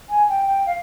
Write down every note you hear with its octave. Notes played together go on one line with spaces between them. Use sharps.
G#5
G5
G5
F5